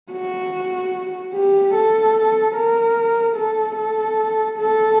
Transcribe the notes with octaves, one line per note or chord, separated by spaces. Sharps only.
F#4
G4
A4
A#4
A4
A4
A4